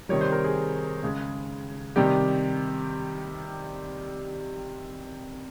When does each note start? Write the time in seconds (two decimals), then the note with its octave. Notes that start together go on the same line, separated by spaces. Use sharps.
0.09 C3 D#3 G3 C#5
0.21 C5
0.32 A#4
0.44 G#4
1.03 C#3 G#3
1.96 C3 D#3 G3 G4